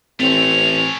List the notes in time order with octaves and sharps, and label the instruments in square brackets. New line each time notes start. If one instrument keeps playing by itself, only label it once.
[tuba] A1 [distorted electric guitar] A3 C#4 [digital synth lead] C4 [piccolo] F7